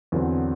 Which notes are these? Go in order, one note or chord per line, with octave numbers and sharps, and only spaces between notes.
E2 D3 F#3 C4